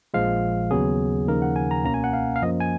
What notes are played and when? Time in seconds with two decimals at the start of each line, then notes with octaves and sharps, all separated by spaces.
0.14 A#1 A#2 F3 G#3 F5
0.71 D#2 C#3 F#3 B3 G#4
1.27 D#2 C#3 F3 A#3 D#4 A#4
1.42 F#5
1.56 G#5
1.71 A#5
1.84 C#2 B2 A#3 C#4 A#5
1.94 G#5
2.04 F#5
2.13 F5
2.36 F5
2.42 F#2 F3 A#3 C#4 D#5
2.60 G#5